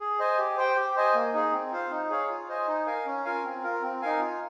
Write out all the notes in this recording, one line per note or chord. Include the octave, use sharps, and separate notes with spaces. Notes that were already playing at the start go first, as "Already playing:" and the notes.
G#4
C5 D#5 G#5
G4
C5 G5
G4
C5 D#5 G#5
A#3
D#4 G#4
C4
F4 C5 F5
D#4
G#4 C#5 F5
F4
C5 D#5 G#5
D#4
A#4 F5 G#5
C#4
F4 A#4 F5 G#5
C4
F4 A#4
C4
D#4 A#4 F5 G#5
F4